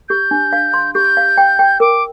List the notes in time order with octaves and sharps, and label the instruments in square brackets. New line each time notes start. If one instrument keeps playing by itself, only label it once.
[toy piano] G4 [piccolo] G6
[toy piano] D4
F5
C6
[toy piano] G4 [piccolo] G6
[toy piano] F5
G5
G5
[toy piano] A#4 [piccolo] D6